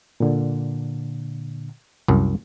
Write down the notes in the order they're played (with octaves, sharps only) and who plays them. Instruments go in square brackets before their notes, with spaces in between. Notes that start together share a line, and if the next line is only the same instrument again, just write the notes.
[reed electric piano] A#2 D3
[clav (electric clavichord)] C2 F#2